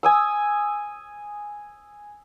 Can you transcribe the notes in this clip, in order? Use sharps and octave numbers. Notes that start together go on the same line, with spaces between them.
G#5 D#6 E6